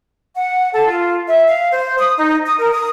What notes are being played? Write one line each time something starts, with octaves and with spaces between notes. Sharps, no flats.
F#5
A4
F4
E5
F5
C5
D#6
D#4
D#6
A#4
D#6